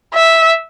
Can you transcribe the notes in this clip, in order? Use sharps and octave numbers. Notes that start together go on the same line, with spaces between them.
E5